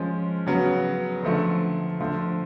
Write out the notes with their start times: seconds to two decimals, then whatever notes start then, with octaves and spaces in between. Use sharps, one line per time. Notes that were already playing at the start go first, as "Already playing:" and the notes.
Already playing: F3 G#3 C#4
0.47 C#3 F#3 B3
1.23 D3 F3 A3
2.00 D3 F3 A3